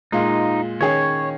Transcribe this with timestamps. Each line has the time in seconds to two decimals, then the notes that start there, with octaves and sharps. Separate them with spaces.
0.12 A#2 G#3 D#4 F4
0.80 D#3 C#4 G#4 C#5